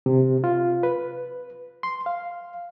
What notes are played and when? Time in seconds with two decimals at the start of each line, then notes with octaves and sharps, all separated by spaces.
0.06 C3
0.44 F4
0.83 B4
1.83 C6
2.06 F5